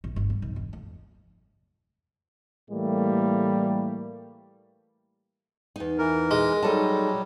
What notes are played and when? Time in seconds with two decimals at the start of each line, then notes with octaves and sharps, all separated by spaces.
0.04 A#1
0.16 G1
0.30 G2
0.42 B1
0.56 E1
0.73 F2
2.71 A2 E3 G3 A3 A#3
5.76 E2 D#4
5.98 E3 A#4
6.31 G#3
6.63 F#3 G3 D#4 A4 A5